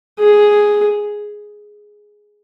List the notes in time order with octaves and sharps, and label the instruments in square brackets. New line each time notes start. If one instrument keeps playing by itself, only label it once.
[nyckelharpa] G#4